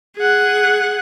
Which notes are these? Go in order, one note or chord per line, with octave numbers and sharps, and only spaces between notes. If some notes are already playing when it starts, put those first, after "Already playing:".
G#4 F#5